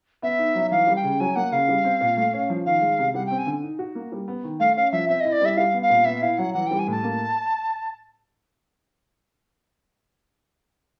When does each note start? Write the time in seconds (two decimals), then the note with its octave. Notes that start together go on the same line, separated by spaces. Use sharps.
0.22 B3 E5
0.39 D#4
0.55 F#3
0.71 E3 F5
0.87 G3
0.96 G5
1.03 C#3
1.20 F#3 G#5
1.36 A#3 F#5
1.52 C#3 F5
1.68 G3
1.84 C4
2.01 A#2
2.17 A3
2.33 C#4
2.50 F3
2.66 D#3 F5
2.81 G#3
2.99 C3
3.14 G3 F#5
3.26 C4 G5
3.38 G#5
3.47 D3
3.63 D#4
3.79 F#4
3.95 A#3
4.12 G3
4.28 B3
4.44 D#3
4.60 A3 F5
4.76 C#4 F5
4.92 F3 E5
5.09 C4 E5
5.21 E4 D#5
5.32 D5
5.41 G3 E5
5.57 G3 F5
5.73 B3
5.82 F5
5.90 A#2
6.05 B3 E5
6.22 E4 F5
6.38 F#3 F#5
6.54 E3 F#5
6.67 G3 G5
6.79 G#5
6.87 A2 A5
7.04 A#3